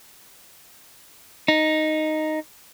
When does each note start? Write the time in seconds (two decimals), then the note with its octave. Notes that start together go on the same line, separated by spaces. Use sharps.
1.48 D#4